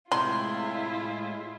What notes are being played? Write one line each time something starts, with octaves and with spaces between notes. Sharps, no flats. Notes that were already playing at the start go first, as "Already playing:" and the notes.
A2 C3 G#3 E4 F4 C6